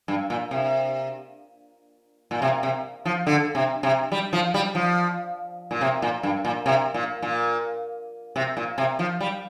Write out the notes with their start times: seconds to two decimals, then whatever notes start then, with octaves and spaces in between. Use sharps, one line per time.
0.08 G2
0.30 A#2
0.51 C3
2.31 A#2
2.42 C3
2.63 C3
3.05 F3
3.27 D3
3.55 C3
3.83 C3
4.12 G3
4.33 F3
4.54 G3
4.75 F3
5.71 A#2
5.81 C3
6.02 A#2
6.23 G2
6.45 A#2
6.66 C3
6.94 A#2
7.22 A#2
8.36 C3
8.57 A#2
8.78 C3
8.99 F3
9.21 G3